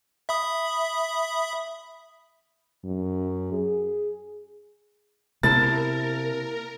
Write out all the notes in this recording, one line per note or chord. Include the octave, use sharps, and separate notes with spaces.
E5 B5 D#6
F#2
G#4
C3 A#3 E4 A#4 A5 A6